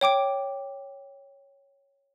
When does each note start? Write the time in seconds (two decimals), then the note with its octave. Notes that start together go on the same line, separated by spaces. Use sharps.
0.01 C#5 G5 D6 D7